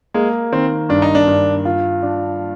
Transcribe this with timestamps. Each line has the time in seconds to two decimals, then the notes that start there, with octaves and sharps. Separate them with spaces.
0.14 G#3 A#3
0.52 D#3 C4
0.89 G2 D4
1.02 D#4
1.15 D4
1.27 G2
1.65 F4
2.03 D4